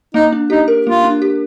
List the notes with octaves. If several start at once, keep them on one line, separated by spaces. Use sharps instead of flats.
A#3 D#4
D4
D#4 G4
A#4
A#3 F4
D4
G4